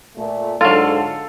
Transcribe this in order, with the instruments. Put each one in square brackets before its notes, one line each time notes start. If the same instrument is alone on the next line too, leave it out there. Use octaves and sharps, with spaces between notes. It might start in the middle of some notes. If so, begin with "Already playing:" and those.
[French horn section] A#2 A3
[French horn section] G#2 D3 [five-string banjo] F#3 F4 [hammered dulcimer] A4 F5